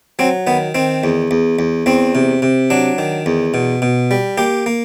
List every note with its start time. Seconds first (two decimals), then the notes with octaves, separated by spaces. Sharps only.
0.19 F#3 C4
0.47 D#3 B3
0.75 D#3 C4
1.04 E2
1.31 E2
1.59 E2
1.86 E2 C4
2.15 C3
2.42 C3
2.70 F#3 D4
2.98 D#3
3.26 E2
3.54 B2
3.82 B2
4.11 G3
4.38 A#3 G4
4.66 A#3